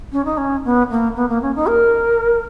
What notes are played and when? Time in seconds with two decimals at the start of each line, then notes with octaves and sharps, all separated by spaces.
0.12 C#4
0.25 D#4
0.37 C#4
0.65 B3
0.90 A#3
1.16 B3
1.29 A#3
1.42 C#4
1.55 D#4
1.68 A#4